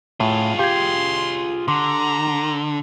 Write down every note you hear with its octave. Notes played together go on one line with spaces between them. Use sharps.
A2 F4 G#4
G4 F5 C6 G#6
D3 A#5 C6 D6